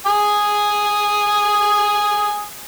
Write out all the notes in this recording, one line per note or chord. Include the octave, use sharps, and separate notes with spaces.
G#5 D#6